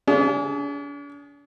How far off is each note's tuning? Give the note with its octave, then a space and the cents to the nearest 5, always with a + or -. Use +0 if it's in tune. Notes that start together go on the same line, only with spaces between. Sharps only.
D4 -45 G#4 +0